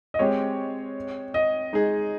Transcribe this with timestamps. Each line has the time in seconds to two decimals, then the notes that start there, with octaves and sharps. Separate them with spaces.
0.14 D#5
0.19 G#3 C4 G4 C#5
1.34 D#5
1.73 G#3 D#4 G#4